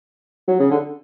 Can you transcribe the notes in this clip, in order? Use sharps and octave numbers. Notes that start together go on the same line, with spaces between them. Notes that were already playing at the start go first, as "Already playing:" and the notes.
F#3
C#3
D3